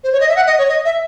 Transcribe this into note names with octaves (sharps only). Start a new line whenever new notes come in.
C5
C#5
D#5
E5
F#5
D#5
C#5
D#5
E5